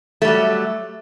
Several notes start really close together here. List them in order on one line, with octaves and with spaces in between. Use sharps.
A3 G3 F#3